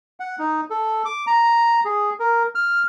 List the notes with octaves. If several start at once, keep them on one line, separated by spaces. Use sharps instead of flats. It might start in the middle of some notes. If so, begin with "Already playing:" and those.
F#5
D#4
A4
D6
A#5
G#4
A#4
F6